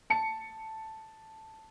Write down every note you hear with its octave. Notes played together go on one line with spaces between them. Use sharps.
A5 C#7